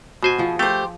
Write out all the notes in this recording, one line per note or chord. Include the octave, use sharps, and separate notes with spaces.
B2 F#4 C5 G#5
F3 G#4
A3 G4 C5